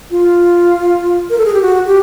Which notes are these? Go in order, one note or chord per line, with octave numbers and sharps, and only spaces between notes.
F4
A#4
A4
G#4
G4
F#4
G4